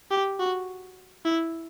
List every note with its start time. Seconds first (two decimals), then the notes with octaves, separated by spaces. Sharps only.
0.11 G4
0.39 F#4
1.25 E4